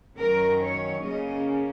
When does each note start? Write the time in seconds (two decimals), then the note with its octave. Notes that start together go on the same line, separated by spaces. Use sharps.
0.16 F#2 D#3 F#3 C#4 A#4
0.59 C#5
1.02 C#3 A#3 C#4 D#5